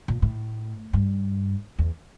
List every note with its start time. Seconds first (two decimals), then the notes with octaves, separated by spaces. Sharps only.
0.08 A#2
0.22 A2
0.93 G2
1.79 E2